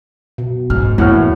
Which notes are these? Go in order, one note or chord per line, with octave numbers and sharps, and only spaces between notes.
B2
G#2 F6
E2 A2 A#3 E4 C#5 F#5 F6